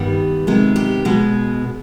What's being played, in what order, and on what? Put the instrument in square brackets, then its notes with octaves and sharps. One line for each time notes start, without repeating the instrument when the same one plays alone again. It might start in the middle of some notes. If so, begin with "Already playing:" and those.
Already playing: [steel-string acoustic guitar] G2 D#3 G3 B3
C3 D#3 G#3 B3
G4
B2 G#3 B3